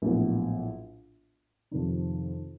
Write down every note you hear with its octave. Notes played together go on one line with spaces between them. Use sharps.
A#1 A2 F#3 B3
F2 C3 D#3